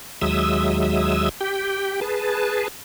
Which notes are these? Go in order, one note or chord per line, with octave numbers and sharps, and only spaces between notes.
D#2 F#3 G#3 E5 D#6 E6
G4 G5
G#4 B4 A5